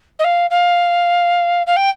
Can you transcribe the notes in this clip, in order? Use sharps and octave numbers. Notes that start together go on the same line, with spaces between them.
D#5
F5
F5
F5
G5